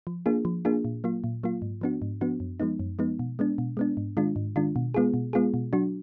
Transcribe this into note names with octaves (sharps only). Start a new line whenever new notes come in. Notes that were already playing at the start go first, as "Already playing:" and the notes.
F3
A#3 D4 F4 G#4
F3
A#3 D4 F4 G#4
A#2
F#3 A#3 F4
A#2
F#3 A#3 F4
G#2
F3 B3 D4 F#4
G#2
F3 B3 D4 F#4
F#2
F3 G#3 B3 D#4
F#2
F3 G#3 B3 D#4
B2
G#3 B3 D4
B2
G#3 B3 D4
G#2
D#3 G#3 D4 F4
G#2
D#3 G#3 D4 F4
B2
G#3 B3 F4 G#4
B2
G#3 B3 F4 G#4
B2
F#3 D4 F#4